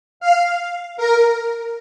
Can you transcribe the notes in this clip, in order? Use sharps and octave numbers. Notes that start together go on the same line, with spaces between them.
F5
A#4